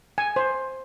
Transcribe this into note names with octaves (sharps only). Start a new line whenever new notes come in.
G#5
C5